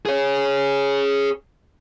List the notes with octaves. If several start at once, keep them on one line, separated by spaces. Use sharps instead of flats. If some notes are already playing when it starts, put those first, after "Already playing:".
G#4 C#5